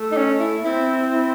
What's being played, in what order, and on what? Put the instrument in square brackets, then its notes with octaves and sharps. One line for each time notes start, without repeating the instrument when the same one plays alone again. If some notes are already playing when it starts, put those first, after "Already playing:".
Already playing: [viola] A3
[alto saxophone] D#4
C#4
E4
[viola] C4 [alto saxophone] E4
[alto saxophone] E4